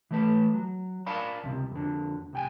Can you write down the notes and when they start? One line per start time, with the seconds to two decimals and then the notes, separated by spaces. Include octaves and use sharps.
0.11 E3 A3 B4
0.54 F#3
1.06 A#4 D5 F5 A5 B5
1.43 C#2 C3
1.71 F2 D3
2.33 C2 G5 G#5